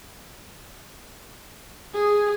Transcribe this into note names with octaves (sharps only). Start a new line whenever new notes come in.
G#4